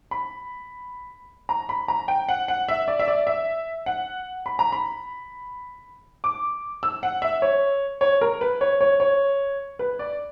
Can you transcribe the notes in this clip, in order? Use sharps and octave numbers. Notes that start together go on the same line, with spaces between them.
B5
A#5
B5
A#5
G5
F#5
F#5
E5
D5
E5
D5
E5
F#5
B5
A#5
B5
D6
E6
F#5
E5
C#5
C#5
A#4
B4
C#5
C#5
C#5
B4
D5